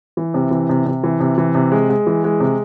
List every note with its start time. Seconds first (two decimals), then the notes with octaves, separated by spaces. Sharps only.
0.17 E3
0.34 C3
0.51 E3
0.69 C3
0.86 C3
1.03 E3
1.20 C3
1.38 E3
1.55 C3
1.72 G#3
1.90 G#3
2.07 E3
2.24 G#3
2.40 C3